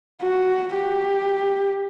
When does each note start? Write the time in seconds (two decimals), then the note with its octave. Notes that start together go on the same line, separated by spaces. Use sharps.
0.22 F#4
0.75 G4